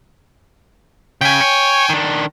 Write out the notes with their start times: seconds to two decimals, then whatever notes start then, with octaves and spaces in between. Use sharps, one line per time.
1.21 C#3 G5 G#5
1.40 C#5
1.90 D#3 D4